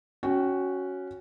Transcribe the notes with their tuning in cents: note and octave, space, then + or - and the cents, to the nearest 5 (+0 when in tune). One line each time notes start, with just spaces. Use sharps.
C#4 +0 F#4 +0 G5 -25